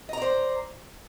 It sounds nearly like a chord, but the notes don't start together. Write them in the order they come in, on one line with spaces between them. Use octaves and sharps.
D#5 A#5 D5 C5